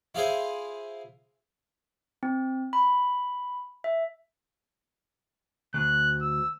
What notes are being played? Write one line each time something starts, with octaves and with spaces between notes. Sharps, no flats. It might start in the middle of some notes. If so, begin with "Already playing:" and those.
E4 F4 G#4 C5 E5
C4
B5
E5
D2 F#6
E6